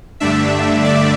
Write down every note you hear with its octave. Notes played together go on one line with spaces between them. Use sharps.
G2 D3 A3 D4 E5
D5